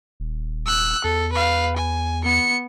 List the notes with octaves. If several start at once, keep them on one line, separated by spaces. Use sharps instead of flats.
D#1
E6 F#6
E2 A4
B4 F5
G#5
B3 C#7